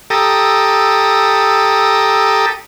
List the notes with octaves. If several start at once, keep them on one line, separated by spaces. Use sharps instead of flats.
G4 A4 A#5 D#6 E6